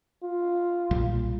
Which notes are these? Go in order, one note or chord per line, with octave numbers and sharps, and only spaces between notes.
F4
B1 A#2 G3